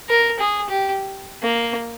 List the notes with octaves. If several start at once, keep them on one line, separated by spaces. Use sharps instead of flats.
A#4
G#4
G4
A#3